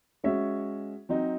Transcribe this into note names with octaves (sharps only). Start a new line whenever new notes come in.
G#3 C#4 F#4 C#5 E5
F#3 C4 D#4 F#4